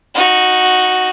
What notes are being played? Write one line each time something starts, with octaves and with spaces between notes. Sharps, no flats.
D#4 F#4